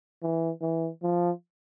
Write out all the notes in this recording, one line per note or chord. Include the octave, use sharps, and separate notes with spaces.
E3
E3
F3